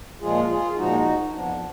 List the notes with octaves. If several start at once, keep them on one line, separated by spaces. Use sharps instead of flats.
A#2 F3 G#3 F4 G#4
F4 G#4
A#2 F3 G#3 D#4 F#4
D#4
F2 F3 B3 D4